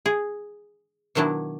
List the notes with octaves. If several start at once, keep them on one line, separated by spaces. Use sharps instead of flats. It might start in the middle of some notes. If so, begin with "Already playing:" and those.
G#4
B2 D#3 F#3 D4 E4